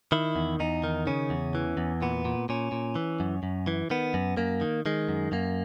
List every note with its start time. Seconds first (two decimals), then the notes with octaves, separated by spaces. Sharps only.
0.12 D#3 E4
0.36 E2
0.60 E2 D#4
0.84 D#3
1.07 C#3 C#4
1.30 E2
1.55 E3
1.77 E2
2.02 A#2 B3
2.25 A#2
2.49 A#2 C#4
2.72 A#2
2.95 E3
3.20 F#2
3.43 F#2
3.67 E3
3.90 D#3 B3
4.14 F#2
4.37 F#2 A#3
4.61 D#3
4.86 D#3 G#3
5.09 F#2
5.32 F#2 A#3